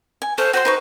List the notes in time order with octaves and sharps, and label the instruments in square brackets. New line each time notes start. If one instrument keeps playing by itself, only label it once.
[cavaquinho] G#5
[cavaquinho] A4 C#5 F5 [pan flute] C5
[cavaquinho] F#4 C6 [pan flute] C5
[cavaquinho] D#4 B4 C#6